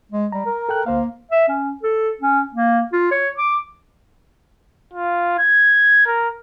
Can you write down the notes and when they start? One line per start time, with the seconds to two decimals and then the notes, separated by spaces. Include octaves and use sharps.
0.12 G#3
0.32 G3 A#5
0.46 A#4
0.69 A4 G5 F#6
0.86 D2 A#3 C5 F5
1.31 E5
1.49 C#4
1.83 A4
2.21 C#4
2.54 A#3
2.93 F4
3.11 C#5
3.38 D6
4.94 F4
5.39 G#6
6.06 A#4